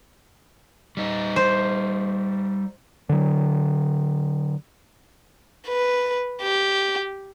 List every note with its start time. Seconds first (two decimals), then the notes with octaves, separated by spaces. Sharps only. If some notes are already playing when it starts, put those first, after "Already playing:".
0.97 G3 D#4
1.36 C5
3.09 D3 F#3
5.68 B4
6.42 G4